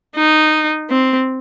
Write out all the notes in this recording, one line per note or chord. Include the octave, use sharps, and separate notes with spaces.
D#4
C4